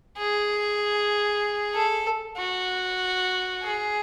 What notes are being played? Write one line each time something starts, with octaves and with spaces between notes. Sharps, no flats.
G#4
A4
F#4
G#4